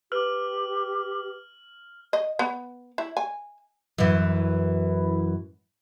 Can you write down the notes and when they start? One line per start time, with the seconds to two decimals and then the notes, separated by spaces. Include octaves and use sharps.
0.12 G4 B4 D6 F6 F#7
2.13 D#5
2.39 B3
2.98 E4
3.17 G#5
3.98 F#2 E3